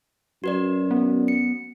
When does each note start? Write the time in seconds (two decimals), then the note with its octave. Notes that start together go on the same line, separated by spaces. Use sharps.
0.44 F#2 F#4 B4 D5
0.91 B3
1.28 C#7